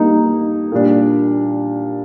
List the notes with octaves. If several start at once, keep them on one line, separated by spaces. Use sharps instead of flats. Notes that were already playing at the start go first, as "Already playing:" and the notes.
Already playing: G3 A#3 D#4
A#2 G3 D4